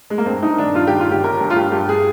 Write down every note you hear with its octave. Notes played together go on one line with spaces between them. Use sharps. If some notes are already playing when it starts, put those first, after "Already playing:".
G#3
A#3
G2 C4
G2 D#4
D#3 D4
G2 F4
D#3 G4
F4
G1 G4
G1 A#4
G2
F4
G2 G4
G2 G4
G#4